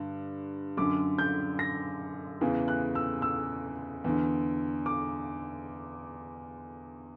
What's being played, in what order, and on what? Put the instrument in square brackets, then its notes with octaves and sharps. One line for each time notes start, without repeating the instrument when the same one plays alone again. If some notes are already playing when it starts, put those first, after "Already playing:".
Already playing: [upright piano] G2 D3
F#2 D3 D6
G6
A#6
E2 C#3 E3
F#6
E6
E6
E2 D3
D6